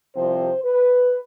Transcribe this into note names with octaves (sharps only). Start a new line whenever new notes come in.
C2 C3 F3 C4 C5
B4